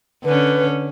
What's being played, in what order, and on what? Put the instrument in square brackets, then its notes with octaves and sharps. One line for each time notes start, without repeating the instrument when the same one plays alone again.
[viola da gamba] D3 C#4 [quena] B4